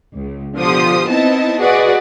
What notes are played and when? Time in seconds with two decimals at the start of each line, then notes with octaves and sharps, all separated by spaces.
0.15 C#2
0.56 B2 D3 F3 G4 C6 D#6
1.08 B3 C4 D#4 E4 D#5 A5
1.60 F#4 G#4 B4 D5 D#5 F#5